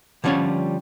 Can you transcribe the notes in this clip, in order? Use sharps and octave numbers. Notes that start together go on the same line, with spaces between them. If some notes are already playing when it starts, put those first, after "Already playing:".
D3 F3 G3 C#4 F4 C#5